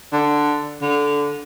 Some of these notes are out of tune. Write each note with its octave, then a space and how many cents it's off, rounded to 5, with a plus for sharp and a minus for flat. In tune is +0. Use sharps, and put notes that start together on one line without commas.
D3 +5
D3 -15